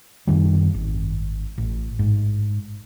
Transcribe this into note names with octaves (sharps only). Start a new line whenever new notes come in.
F#2 D#3 G3
G#1
A1
G#2